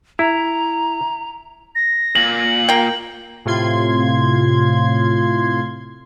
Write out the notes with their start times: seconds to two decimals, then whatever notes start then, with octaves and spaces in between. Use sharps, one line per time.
0.19 E4 A#5
1.75 A#6
2.15 A#2 F#7
2.68 A#3 G5
3.45 A2 C3 F4 C6 G#6